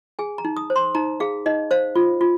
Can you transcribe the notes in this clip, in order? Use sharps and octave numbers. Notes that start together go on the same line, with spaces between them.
G#4 G#5
A#5
D#4
D#6
C5
C6
D#4 A#5
G#4 F5
D#4 D#5
C5 F5
F4
F4